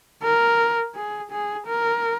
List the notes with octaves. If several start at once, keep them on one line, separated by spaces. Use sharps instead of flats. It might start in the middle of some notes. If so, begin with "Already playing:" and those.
A#4
G#4
G#4
A#4